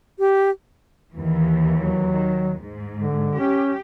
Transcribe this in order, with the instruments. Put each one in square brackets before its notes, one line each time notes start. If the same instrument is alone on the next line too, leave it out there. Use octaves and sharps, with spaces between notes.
[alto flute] G4
[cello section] D#2 E3
[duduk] F#3
[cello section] D#3
G#2
[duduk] D3
[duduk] C#4 [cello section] G4